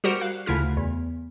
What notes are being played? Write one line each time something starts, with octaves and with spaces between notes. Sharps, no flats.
G3 F#4 G4 A#4 C5 F#5
F5 F#6
D2 C#3 E4 F4 F6 B6
E2